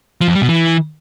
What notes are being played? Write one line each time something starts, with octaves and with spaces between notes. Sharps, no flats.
F3
F2
G3
B2
E3